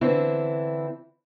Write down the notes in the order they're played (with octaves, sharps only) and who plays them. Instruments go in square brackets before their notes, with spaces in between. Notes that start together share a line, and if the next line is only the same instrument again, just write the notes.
[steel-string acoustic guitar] D3 E3 C4 D4 E4